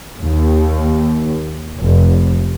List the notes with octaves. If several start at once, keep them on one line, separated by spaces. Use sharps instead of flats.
D#2
F1